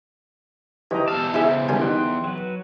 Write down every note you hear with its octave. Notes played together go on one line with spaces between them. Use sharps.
E3 G4 D#5 A#5
E2 F5 A5 E6
C#3 E4 G#4 C5 E5
D#3 G3 G#5
D#4 G5 C6 F#6
F#3 B4